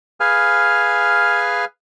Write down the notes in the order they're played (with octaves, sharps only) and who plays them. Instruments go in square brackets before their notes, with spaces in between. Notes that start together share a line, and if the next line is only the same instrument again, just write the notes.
[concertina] G#4 B4 F5 G#5 F6